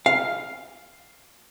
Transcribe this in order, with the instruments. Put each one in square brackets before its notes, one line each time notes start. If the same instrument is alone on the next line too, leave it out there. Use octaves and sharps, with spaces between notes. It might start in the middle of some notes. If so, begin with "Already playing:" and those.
[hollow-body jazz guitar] F5